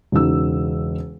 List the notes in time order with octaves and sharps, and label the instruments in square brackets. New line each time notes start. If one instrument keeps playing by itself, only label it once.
[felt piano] E1 C#3 D#4 E6